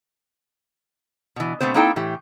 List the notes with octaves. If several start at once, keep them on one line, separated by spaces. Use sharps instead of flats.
B2 E3
B2 A3 B3 C4 C5
A#3 C4 D#4 E4 A4 G5
A2 E3 G4